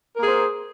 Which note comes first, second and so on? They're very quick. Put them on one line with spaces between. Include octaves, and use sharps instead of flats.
A#4 A#3 G#4 C5